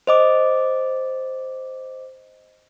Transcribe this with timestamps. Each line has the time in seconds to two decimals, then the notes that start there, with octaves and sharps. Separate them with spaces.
0.07 C5 D#5 D6